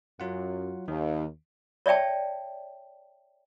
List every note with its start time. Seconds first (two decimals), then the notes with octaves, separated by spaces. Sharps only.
0.20 F#2 F#3 F4 F#5
0.88 D#2 D#3
1.86 C#5 D5 E5 G5 A5